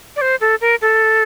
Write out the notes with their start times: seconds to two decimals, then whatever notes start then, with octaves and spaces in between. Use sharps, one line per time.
0.16 D5
0.21 C5
0.41 A4
0.61 A#4
0.81 A4